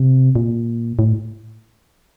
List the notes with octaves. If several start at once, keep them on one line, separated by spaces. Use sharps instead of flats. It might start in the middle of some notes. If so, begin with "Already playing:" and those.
Already playing: C3
A#2
A2